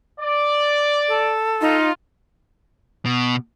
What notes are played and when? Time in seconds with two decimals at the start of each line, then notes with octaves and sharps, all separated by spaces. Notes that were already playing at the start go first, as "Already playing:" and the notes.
0.20 D5
1.08 A4
1.61 D#4 F4
3.06 B2